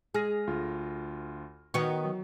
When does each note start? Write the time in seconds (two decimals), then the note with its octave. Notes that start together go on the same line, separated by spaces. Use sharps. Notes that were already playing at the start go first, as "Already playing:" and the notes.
0.14 G#3 G#4 F6 A#6
0.47 D2 F4
1.74 D#3 B3 F#4 C#5
2.05 F#3